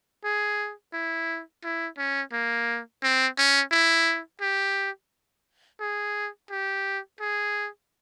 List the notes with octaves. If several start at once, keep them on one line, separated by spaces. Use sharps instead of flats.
G#4
E4
E4
C#4
A#3
C4
C#4
E4
G4
G#4
G4
G#4